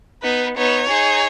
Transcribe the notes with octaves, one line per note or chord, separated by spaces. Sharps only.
B3 D#4 B4
B3 D#4 C#5
D#4 G#4